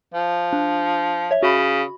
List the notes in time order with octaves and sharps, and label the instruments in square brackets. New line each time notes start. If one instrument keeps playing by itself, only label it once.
[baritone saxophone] F3
[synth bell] D4
C#5 E5
[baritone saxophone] C#3 [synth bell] F#4 B5